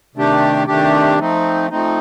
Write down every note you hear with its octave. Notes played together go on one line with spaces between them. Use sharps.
C3 D#3 A3 D4 G4
C3 D#3 A3 D4 G4
F3 A3 C4 D#4
F3 A3 C4 D#4